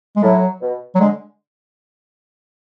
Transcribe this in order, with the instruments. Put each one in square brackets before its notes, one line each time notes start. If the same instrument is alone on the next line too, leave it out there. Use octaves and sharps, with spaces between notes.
[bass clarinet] G#3
[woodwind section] A2 [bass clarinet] F#3
[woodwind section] B2
[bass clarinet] F#3
[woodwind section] D3 [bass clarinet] G#3